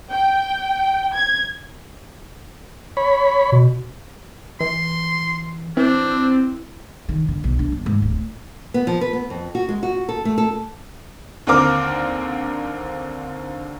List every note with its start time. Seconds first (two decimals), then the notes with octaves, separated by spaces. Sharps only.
0.10 G5
1.15 G#6
2.97 C#5 B5
3.52 B2
4.60 E3 C6
5.77 E3 C4 D4
7.09 D#3
7.28 D3
7.44 B1
7.59 D4
7.72 G1
7.86 G#2
8.02 D1
8.74 B3
8.87 F3
9.01 B4
9.13 B3
9.30 F2
9.55 F#4
9.69 G#3
9.83 F#4
10.09 A4
10.25 A3
10.38 A4
11.47 D#2 D3 C4 A#4 D6 F6